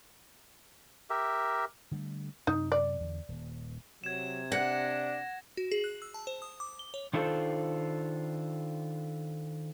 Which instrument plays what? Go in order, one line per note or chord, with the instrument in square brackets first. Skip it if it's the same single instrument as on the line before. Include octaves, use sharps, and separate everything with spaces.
[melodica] G4 A#4 E5
[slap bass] D3 G3 A3
[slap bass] F#2 C3 [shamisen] D#4
[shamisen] D5
[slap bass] E2 D3
D#1
[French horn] C3 [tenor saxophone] F#3 [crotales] G#6 E7
[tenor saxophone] D4 [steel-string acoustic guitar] F#5 [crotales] A#6
[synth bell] F#4
G#4
F#6
E6
A5
C5
D#6
D6
G7
C#5
[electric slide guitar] D#3 D4 D#4 F4 A4 C5